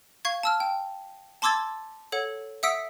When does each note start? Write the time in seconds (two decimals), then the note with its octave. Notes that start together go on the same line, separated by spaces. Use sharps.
0.25 F5 C#6 G#6
0.43 A5 E6 F6
0.60 G5
1.42 A5 C6 D6 E6 G#6 A6
2.12 A4 C#5 F#5
2.63 E5 F#5 D#6 E6 B6 D7